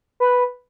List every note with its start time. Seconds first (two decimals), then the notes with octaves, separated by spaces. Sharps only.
0.20 B4